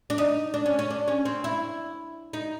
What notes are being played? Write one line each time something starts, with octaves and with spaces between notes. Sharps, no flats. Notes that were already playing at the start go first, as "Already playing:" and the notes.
D4
D#4
D4
C#4
C#4
D4
C#4
C4
E4
D#4